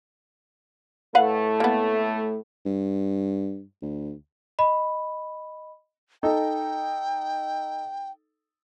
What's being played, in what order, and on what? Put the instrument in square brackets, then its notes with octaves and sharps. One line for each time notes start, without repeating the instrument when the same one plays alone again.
[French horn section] A2 A3 [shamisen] B4 F5 F#5
[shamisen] A#3 B3
[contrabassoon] G2
D2
[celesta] D#5 B5
[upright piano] D#4 A4 [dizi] G5